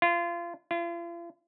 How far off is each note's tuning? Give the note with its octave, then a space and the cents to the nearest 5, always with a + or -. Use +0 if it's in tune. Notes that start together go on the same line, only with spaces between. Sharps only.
F4 -25
F4 -40